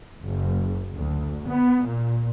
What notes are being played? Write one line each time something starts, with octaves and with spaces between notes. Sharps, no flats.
F#1
D2
B3
A#2